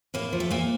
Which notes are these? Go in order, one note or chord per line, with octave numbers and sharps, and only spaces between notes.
A2 A#3
F3
A3
A#2 A#3